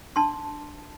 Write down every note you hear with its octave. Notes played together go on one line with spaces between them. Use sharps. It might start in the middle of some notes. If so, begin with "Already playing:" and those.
D4 A5 C6